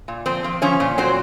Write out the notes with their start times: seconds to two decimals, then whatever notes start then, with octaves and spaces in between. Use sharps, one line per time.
0.08 A#2
0.26 F3 C4 C5
0.44 F3
0.62 F3 C#4 C#5
0.80 A#2
0.98 F#3 C4 C5